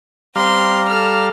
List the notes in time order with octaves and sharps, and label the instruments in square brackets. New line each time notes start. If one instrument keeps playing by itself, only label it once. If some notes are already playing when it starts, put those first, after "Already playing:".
[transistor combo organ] G3 F5 A#5 [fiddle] C4 C6
[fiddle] A4 F6